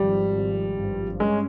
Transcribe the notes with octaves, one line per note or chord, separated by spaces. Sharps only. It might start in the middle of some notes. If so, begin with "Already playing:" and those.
Already playing: G#1 F3 G3
G#1
G2
G#3 C#4